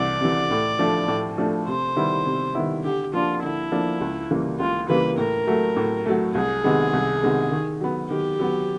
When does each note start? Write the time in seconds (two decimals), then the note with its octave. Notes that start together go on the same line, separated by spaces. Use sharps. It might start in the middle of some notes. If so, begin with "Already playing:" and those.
Already playing: C2 C3 E3 D5
0.21 C3 E3
0.51 A2
0.79 F3 A3 D4
1.08 A2
1.38 F3 A3 D4
1.67 C3 C5
1.96 D#3 G3 B3 E4
2.26 C3
2.55 D#3 G3 B3 E4
2.84 D3 G4
3.13 F3 A#3 D4 F4
3.42 D3 E4
3.72 F3 A#3 D4
4.01 C#2
4.31 C#3 E3 G3 A#3
4.59 C#2 F4
4.89 C#3 E3 G3 A#3 B4
5.17 A2 A#4
5.47 F#3 A3
5.76 A2
6.06 F#3 A3
6.35 C2 G#4
6.64 C3 D#3 G#3 B3
6.93 C2
7.23 C3 D#3 G#3 B3
7.52 D#3
7.81 F#3 B3
8.10 D#3 G4
8.39 F#3 B3